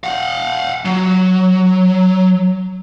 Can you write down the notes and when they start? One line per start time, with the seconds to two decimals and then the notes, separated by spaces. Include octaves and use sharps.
0.04 F5 F#5
0.85 F#3